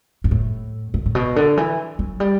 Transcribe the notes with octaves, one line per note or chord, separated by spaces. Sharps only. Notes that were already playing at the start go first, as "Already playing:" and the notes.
G2
A2
A2
A2
B2
D3
E3
F#3
G3